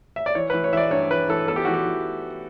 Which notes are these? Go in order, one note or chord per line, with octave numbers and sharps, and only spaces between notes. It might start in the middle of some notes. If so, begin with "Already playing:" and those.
E5
D5
E3 C#5
E3 B4
C#5
E3 D5 E5
G2 C#5
E3 B4
E3 A4
B3 A4
G4
E3 F#4
G4
E3